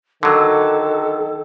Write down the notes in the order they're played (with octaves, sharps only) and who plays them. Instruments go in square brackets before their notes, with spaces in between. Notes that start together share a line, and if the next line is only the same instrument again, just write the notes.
[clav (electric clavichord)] D3 F#3 [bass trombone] D#3 [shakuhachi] A4